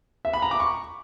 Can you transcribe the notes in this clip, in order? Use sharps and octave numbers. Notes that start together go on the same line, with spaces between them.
E5
B5
A#5
D6
C#6